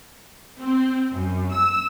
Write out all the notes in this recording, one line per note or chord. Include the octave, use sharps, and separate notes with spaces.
C4
F#2
E6